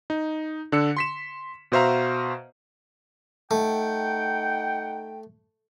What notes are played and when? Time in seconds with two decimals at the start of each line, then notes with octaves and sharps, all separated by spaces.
0.10 D#4
0.72 D3 D4 E6 C#7
0.97 C6 B6 E7
1.72 B2 F#4 C5 E5 F5 A#5
3.51 A3 D#4 F#5 G5